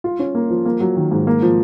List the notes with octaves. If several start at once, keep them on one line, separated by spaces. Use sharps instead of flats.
F4
C#4
A#3
F3
A#3
F#3
D#3
G#2
A#3
F3